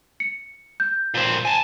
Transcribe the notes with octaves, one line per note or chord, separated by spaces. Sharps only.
C#7
G6
A#2 C4
G#5 A5